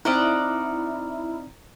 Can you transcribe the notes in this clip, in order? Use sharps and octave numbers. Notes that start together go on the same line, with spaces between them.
C4 D#4 E4 D5 D#5 F#5 A#5 F6